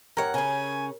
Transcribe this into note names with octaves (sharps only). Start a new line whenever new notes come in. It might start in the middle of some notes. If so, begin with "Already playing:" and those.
G2 A#4 C#5 F#5
C#3 C#4 G#5